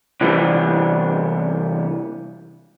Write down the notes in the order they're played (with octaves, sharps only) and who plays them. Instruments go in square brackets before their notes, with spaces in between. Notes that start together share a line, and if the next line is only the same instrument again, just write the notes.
[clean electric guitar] C3 E3 G3 B3 D4